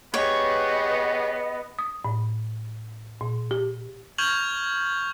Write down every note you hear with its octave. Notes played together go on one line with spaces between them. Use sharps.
B3 G4 G#4 C#5 D#5
D#6
A2
A#2
G4
C#6 F6 G6 G#6 F7 F#7